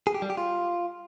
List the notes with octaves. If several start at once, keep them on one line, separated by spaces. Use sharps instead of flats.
G#4
G4
G3
G4
F4